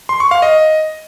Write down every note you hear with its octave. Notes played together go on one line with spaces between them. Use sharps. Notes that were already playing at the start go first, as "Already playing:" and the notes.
C6
C#6
F5
D#5